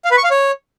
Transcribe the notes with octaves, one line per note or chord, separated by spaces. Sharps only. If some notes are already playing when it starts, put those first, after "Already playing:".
F5
B4
C#6
F5
C#5